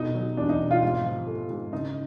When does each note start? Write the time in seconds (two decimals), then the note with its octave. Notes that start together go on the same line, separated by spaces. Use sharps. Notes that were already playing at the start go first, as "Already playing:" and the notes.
Already playing: B2 A3 D#4
0.15 F#3
0.37 E2 D4
0.49 D#4
0.60 B2
0.71 F4
0.82 G#2 F4
1.04 F3
1.27 A3
1.50 G#2
1.72 C#3 D#4